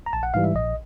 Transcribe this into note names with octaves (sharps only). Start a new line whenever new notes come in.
A#5
A#1 A5
F#5
G#2 E3 G3 F5
E5
A#1 D#5